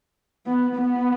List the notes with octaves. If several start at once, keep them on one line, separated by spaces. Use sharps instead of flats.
B3
B3